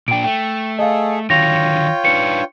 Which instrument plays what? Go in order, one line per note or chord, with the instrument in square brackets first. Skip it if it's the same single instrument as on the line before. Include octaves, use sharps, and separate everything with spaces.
[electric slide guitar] A#2 D4 [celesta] G5 D7
[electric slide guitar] A3 [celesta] G5
[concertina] G#4 A4 [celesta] D#5 F5
[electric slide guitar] D3 D#3 F#3 [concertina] F4 C#5 G5 [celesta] A#6 F7
[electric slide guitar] D4 D#4 B4 [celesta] C#7